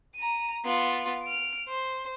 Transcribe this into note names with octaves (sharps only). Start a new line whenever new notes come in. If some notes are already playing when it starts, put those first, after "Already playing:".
A#5 D#7
B3 F4
F6 D7
C5